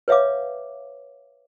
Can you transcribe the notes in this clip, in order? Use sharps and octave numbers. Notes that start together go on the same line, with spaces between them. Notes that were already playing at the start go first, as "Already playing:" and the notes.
B4 C#5 E5 F5 D6